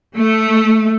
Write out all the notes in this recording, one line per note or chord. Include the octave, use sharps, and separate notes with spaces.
A3